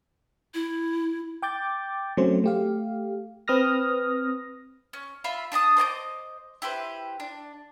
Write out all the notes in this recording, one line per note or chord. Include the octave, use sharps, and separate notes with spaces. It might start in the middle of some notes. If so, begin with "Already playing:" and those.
E4
G5 D6 G6 A6
F#3 A3 C4 C#4 C5
A3 G4 F5
C4 B4 D#6 F6 A#6
C#4
F4 E5 B5
D4 A5 A#5 D#6
C5 D#5 A5 D6
E4 G4 B4 C5
D4